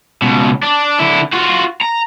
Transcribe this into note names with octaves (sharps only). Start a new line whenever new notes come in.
C#2 B2
D4
D3 E4
F4 F#4
A#5